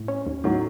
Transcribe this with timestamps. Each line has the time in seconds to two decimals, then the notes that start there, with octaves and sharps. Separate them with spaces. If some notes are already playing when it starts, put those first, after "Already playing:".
Already playing: A2
0.08 C#4
0.26 D#2
0.44 A2 D#3 F#3